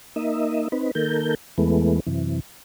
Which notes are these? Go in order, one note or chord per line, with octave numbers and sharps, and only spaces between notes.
A#3 D#4 D#5 E5
C4 D#4 B4
D#3 A#3 A4 A#4 G6
E2 E3 G#3 A3 B3
F#2 C3 E3